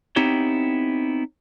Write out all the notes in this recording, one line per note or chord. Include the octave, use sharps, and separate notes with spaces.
B3 C4 D#4 E4 G4 C#5